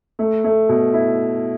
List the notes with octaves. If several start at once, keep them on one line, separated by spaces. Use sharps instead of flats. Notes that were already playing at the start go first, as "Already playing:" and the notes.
A3
A3
B2
E4